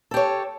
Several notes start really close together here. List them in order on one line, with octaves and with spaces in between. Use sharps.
A4 G4 C#5